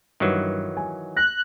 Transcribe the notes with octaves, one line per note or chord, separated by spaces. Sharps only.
G2 D#3 E3 F#3
G#5
F#6 A#6